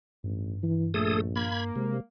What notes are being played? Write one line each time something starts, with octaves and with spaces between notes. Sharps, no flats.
A1 G2
E3
A#1 A3 G#4 A4 D#6
A#3 B5 G#6
C3 G#3